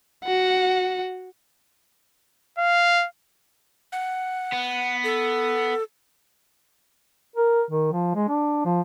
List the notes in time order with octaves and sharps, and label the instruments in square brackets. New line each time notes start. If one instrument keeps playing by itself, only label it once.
[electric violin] F#4 F#5
[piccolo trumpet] F5
[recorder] F#5
[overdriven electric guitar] B3
[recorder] A4
[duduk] A#4
D#3
F3
G#3
D4
F3